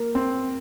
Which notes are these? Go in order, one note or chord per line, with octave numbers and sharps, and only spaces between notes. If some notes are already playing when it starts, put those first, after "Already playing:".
Already playing: A#3
C4